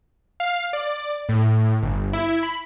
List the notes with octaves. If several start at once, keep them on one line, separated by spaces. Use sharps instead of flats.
F5
D5
A2
G1
E4
B5